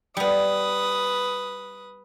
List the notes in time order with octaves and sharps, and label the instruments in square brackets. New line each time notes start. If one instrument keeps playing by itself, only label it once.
[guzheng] G3 B3 [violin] B4 D#6